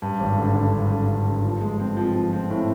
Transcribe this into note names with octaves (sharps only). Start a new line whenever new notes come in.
G2
G#1
D3
D3
G2
D3
G2
D3
F3
G#3
C4
F3
F3
C4
A2